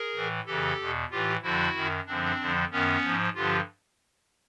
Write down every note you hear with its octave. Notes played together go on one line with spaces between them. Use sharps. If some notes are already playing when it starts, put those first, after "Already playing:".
Already playing: G#4 A#4
A2 E3
F2 C#3 E3 G4 A4
E2 B2
A2 E3 F4 G4
F2 D3 F3 E4 F#4
F#2 D#3
F#2 D3 F3 C4 D4
F2 D3 F3
F#2 D#3 B3 C#4
G#2 F3
G2 D3 F3 F4 G4